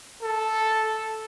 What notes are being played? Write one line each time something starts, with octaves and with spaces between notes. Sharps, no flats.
A4